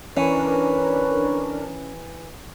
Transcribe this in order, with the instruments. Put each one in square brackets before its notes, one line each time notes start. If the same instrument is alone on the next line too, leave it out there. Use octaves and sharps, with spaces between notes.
[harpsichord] E3 [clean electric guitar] C#4 [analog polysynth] D4 A#4 [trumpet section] B4 C#5